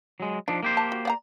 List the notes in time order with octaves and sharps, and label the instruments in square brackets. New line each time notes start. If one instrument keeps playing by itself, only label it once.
[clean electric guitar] F#3 G#3
[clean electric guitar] F3 D4 [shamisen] D#4
[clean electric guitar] A#3 G4 C5
[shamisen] A5
F#4
D5 F#5 A#5